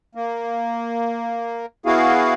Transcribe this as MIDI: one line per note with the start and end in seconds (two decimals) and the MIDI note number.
0.15 1.66 58
1.86 2.34 59
1.86 2.34 64
1.86 2.34 66
1.86 2.34 68
1.86 2.34 77